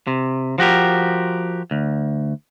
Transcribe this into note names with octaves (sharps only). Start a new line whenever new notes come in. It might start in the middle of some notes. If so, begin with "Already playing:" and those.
C3
F3 F#4 G4 A#4
D2